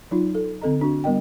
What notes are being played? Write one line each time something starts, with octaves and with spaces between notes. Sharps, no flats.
F#3 D#4 F4
A4
D3 C4 A4 D#5 A#5
D4 F#4
G3 B3 A#4 D#5 G5